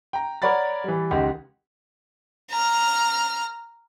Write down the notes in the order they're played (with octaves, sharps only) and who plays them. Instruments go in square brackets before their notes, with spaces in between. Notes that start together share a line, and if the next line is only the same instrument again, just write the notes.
[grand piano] G5 A#5
A#4 C#5 D5 F#5 B5 A6
E3 G3
C#2 D#3 G4 F#5
[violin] A#5 F6